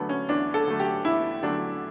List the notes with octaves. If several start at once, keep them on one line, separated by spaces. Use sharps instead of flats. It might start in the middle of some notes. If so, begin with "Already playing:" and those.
Already playing: E2 D3 F#3 A3 B3 D4
C#4
E2 D4
A4
D3 F#3 A3
G4
E2 E4
D3 F#3 A3 D4